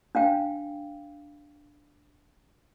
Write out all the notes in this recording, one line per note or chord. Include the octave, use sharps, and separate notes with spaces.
D4 F5 G5